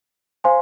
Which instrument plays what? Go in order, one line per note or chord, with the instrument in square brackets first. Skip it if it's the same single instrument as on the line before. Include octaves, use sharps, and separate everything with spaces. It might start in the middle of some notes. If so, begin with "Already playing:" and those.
[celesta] C5 F5 G#5 C6